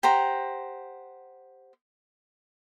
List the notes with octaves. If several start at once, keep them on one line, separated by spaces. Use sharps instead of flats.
G4 C5 F#5 A#5